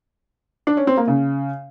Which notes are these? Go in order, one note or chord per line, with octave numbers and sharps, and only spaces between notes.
D4
C#4
C4
A#3
C#3